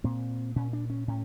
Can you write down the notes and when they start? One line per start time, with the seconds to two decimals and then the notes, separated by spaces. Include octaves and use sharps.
0.04 A#2 C4
0.56 A#2 C#4
0.73 D4
0.90 C#4
1.08 A2 C#4